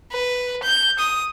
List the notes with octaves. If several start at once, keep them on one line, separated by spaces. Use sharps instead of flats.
B4
G6
D#6